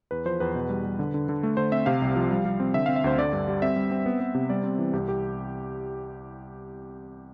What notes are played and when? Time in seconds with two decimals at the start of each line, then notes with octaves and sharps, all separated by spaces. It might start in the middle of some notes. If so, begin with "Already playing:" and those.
0.11 E2 B4
0.25 F3 C5
0.40 E2 B4
0.55 B2
0.69 G3
0.84 G3
0.99 D3
1.14 D3
1.29 D3
1.43 A3
1.57 D3 C5
1.72 C4 E5
1.86 C3 F5
2.02 C2
2.16 F3
2.30 G3
2.45 G3
2.60 C4
2.74 D3 E5
2.86 C4 F5
2.96 E5
3.04 D2 C5
3.18 D3 D5
3.33 G2
3.48 G3
3.62 C4 E5
3.76 G3
3.91 C4
4.06 B3
4.20 B3
4.35 C3
4.50 G3 D5
4.64 C4
4.79 E3
4.93 C2 G4
5.09 G4